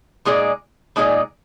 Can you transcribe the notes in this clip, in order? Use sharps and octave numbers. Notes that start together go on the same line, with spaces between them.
A#2 G#3 D#4 G#4 D5
A#2 G#3 D#4 G#4 D5